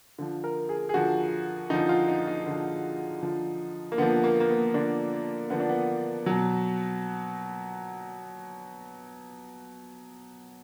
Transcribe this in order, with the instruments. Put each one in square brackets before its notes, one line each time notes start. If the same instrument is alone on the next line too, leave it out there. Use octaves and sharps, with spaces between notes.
[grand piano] D3 F3
A#4
G#4
G#4
D3 F3 F#4
D3 F3 D#4
F4
D#4
D#4
D3 F3
D3 F3
A#3
D3 F3 B3
A#3
A#3
B3
D3 F3 D4
D3 F3 B3
D4
B3
B2 F#3